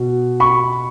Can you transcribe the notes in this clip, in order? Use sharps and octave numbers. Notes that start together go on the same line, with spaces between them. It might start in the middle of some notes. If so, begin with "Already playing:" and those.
Already playing: B2
B5 C#6